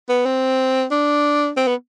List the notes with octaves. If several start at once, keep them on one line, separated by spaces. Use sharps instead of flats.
B3
C4
D4
C4
B3